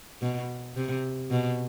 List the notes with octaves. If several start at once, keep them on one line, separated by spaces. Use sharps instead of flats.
B2
C3
B2